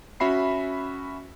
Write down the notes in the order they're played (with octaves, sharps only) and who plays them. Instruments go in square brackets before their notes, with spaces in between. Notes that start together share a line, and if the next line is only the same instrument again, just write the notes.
[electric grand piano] C#4 F#4 E5 B5 C7